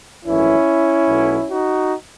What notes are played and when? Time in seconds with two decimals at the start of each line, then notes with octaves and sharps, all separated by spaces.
0.25 G#1 F#2 E3 A3 C#4 E4
1.08 B1 B2 F#3 A3
1.49 D#4 F#4